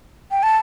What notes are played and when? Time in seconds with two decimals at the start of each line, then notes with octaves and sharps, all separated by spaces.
0.31 G5
0.43 A5